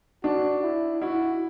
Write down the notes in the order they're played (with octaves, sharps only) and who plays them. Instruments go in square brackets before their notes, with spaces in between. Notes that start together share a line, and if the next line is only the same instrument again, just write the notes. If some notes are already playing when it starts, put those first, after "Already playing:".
[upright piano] D4 [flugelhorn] F#4
[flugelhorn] E4
[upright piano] E4 [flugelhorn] F#4